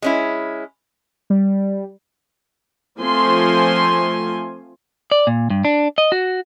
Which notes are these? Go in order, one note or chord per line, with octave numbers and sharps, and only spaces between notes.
G#3 C#4 E4
G3
F3 A3 C4 G#5 C6
D5
A#2
G2
D4
D#5
F#4